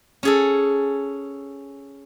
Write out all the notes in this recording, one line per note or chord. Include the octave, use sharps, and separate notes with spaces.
C#4 G#4 A4